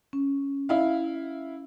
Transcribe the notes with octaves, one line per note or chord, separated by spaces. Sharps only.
C#4
E4 F5